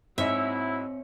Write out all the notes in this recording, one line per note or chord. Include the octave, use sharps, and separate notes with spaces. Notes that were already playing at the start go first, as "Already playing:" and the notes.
G#2 F#3 C4 E4 C#5 D#5 E5